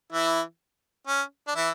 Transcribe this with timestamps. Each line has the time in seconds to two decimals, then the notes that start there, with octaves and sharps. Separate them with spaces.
0.12 E3 E4
1.07 C#4
1.48 D4
1.56 E3 E4